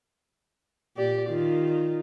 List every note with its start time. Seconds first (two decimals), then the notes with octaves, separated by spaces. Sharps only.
0.97 A#2 G4 D5
1.29 D#3 F4